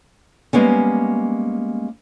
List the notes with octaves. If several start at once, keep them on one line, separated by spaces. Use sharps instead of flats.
G3 G#3 A#3 B3 C#4